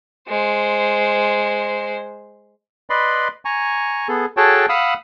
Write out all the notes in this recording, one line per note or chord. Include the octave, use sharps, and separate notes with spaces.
G#3 C5
B4 D5 D#5 B5 C6
G#5 A#5 C#6
B3 G#4 A4
F#4 G#4 A4 C#5 G5 A5
F5 F#5 B5 D#6 E6 F#6